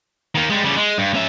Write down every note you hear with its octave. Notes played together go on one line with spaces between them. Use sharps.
D#3 A#3
G3 G#3
C#3 G3
G#3
G2
C#4 E5